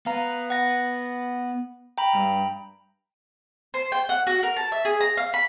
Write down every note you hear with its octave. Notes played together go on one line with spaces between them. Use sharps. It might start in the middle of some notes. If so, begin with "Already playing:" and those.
B3 F5 A#5
F#5 A#6
G5 A#5 B5
G2
C5
G5
F#5
F#4
A#4
A5
E5
G#4
A#5
F5
B5